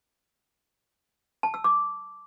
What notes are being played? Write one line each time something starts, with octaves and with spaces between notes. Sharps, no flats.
A5
E6
D6